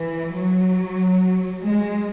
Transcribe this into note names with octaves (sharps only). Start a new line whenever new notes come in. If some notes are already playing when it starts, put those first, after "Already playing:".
Already playing: E3
F#3
G#3